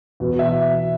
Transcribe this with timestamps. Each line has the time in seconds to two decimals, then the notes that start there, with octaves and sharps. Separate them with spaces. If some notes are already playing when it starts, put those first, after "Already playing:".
0.20 E2 B2
0.39 E5